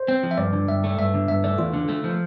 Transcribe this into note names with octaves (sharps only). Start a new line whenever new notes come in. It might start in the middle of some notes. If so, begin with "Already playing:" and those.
Already playing: C5
C4
F3
E5
G2 D5
D3
G2 E5
A3
G2 E5
D3
G2 E5
A3 D5
E2 F4
D3
A3
F3